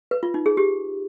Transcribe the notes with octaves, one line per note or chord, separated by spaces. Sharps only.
B4
F4
D#4
G#4
G4